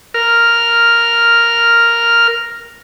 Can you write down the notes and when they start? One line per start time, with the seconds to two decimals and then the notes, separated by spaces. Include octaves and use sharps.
0.14 A#4 F6